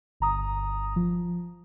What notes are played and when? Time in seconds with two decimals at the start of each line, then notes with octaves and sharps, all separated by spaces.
0.20 G1 A#5 D#6
0.96 F3